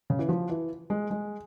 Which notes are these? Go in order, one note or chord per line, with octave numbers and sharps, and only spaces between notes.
C#3
E3
F3
E3
G#3
G#3